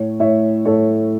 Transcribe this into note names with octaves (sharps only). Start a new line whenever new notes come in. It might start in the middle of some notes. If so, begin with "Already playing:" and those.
Already playing: A2 C#5
A2 C#5 E5
A2 A4 C#5